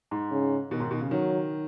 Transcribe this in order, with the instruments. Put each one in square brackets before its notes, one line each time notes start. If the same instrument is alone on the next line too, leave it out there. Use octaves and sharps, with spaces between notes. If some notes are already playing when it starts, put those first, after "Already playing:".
[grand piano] G#2
[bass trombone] C#3
[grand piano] B2 [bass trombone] D#3
[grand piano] G#2
B2
C#3
[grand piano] D#3 [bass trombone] F#3